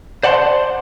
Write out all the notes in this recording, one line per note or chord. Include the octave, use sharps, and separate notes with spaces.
C5 D5 F#5 A5 A#5 C6